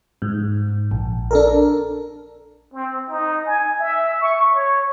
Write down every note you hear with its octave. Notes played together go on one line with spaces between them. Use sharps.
G#2
A#1
D4 A4 A#4
C4
D#4
G#5
E5
C#6
C#5